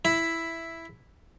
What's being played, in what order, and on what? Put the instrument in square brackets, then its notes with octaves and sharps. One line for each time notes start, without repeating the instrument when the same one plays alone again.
[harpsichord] E4